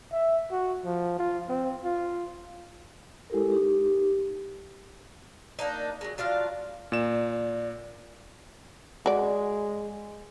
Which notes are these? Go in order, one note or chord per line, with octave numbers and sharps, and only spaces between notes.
E5
F#4
F3
F4
C4
F4
G#3 E4 G4 A4 A#4
D#4 G4
A#3 D4 D#4
F#3 G#3
F#3 D4 F4 F5
A#2 D5 E7
G#3 F#4 D5